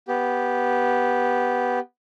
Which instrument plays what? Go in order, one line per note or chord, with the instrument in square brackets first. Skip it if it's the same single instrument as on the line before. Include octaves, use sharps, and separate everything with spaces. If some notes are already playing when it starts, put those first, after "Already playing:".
[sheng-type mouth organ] B3 G4